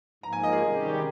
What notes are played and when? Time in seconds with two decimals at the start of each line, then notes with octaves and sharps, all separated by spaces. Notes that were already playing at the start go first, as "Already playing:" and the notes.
0.23 G#2 F3 A#3 A#5
0.33 G#5
0.43 D#5
0.52 G#4
0.63 C3 D#3 G3 C#4 G4